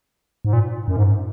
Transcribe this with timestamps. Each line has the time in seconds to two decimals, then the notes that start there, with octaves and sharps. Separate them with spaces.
0.45 G#2
0.53 A#2
0.88 F#2
0.96 G#2